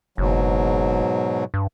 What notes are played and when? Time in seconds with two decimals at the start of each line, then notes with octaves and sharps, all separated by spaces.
0.18 F#1 G#2 B2 F#3
1.54 G2